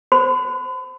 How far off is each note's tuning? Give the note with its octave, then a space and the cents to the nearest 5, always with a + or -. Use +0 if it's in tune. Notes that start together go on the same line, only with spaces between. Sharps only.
C5 +0 B5 +40